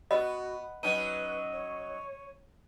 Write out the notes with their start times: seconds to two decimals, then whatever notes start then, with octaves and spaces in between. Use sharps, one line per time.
0.11 B3 F#4 D#5 B5
0.83 F#3 C#4 D#4 B4 D#7
1.52 C#5